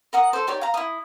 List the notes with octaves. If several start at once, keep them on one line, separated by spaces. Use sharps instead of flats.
A#4 F#5 D#6
A4 C5
D#4 G4 C#5 D5
F5 A#5
E4 C#5 D#6